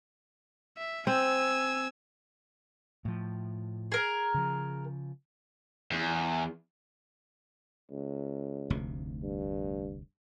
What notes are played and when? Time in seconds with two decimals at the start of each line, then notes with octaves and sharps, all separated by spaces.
0.78 E5
1.07 C4 G#5 E6
3.05 A2 F3
3.92 G#4 A#4
4.34 C#3 F3
5.92 E2
7.91 C#2
8.70 F1 D2 C3
9.23 G2